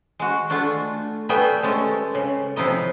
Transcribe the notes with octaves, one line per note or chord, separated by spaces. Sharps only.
G#3 F#4
A3 D4 F4 F#4
G3 A3 B3 G#4 E5 G5
G#3 C#4 A4
C#3
C3 F3 D#4 E4 D#5